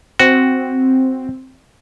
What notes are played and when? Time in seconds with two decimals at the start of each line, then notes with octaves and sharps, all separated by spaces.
0.19 C4 F#4